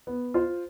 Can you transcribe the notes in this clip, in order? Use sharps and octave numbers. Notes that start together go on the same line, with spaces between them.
B3
F4 C5